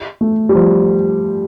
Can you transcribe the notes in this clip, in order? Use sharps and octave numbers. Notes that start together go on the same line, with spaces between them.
A3
G3
F3